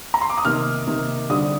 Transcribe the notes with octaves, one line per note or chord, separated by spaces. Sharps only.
A#5
C6
D6
D#6
C3 D#3 A#3 F6
C3 D#3 A#3
D3 G3 C4 D#6